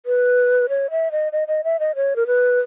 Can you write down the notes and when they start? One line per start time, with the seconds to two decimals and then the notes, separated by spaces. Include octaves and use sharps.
0.06 B4
0.69 C#5
0.90 E5
1.12 D#5
1.32 D#5
1.48 D#5
1.64 E5
1.80 D#5
1.95 C#5
2.16 A#4
2.27 B4